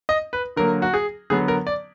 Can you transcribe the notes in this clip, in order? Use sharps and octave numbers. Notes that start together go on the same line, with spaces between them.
D#5
B4
D3 F#3 A#3 A#4
F#4
G#4
D3 F#3 B3 G#4
A#4
D5